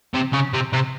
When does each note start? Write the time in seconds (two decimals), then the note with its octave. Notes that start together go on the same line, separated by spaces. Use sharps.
0.14 C3
0.33 C#3
0.53 C3
0.73 C3